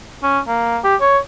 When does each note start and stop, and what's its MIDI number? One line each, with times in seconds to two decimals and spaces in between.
0.23 0.39 61
0.47 0.78 58
0.84 0.95 67
1.01 1.18 73